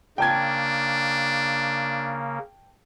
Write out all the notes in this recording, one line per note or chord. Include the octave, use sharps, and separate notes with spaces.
C#3 A#3 D4 G5 A5 G#6